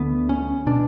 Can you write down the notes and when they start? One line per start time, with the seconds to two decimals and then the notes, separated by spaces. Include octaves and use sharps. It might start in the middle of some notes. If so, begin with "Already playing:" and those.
Already playing: D2 D3 B3
0.29 C#4
0.67 B2 D4